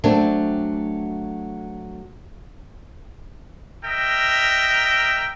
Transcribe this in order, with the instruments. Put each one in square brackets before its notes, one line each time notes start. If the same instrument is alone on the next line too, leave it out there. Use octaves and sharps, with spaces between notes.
[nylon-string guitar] F#3 A3 C4 D4
[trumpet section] A#4 D#5 E5 G5